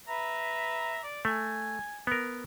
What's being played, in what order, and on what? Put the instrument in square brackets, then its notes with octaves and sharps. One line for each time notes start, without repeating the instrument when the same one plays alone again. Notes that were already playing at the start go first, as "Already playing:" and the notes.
[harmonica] B4 E5 A#5
D5
[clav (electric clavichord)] A3 [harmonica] G#5
[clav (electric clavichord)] B3 A#4